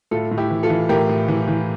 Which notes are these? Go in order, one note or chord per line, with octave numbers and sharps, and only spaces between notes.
A2 F4 A4
A2
E4 G4
E3
F4 A4
E3
A2 G4 A#4
A2
E3
E3